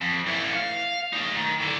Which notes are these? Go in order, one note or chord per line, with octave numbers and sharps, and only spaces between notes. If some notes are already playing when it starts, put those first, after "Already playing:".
F2
E3 A3
F5
A3 D#4
D#3
A2 D3